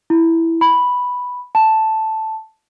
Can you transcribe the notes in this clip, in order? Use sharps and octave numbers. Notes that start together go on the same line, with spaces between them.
E4
B5
A5